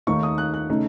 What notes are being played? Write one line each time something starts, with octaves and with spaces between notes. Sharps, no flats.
D#2 D#3 A3 D#4 C#6
D#6
F#6
F#6
C#3 A3 D#4